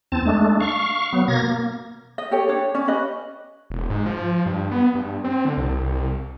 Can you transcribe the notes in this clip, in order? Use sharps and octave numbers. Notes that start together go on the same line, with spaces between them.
E2 C4 A5
G#3 A3 D4
F5 C#6
F#3 B3
B2 A#3 G#6 A#6
A#3
D#5
G4 A4 C#5 G5
D4 C#5
C#4 D5
C#4 G4 B4 D#5
E1
G#2
F3
G2
B3
G2
C4
D3
C2